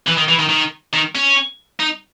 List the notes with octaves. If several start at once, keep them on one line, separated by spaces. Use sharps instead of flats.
E3
D#3
E3
D#3
D#3
D#3
C#4
D#4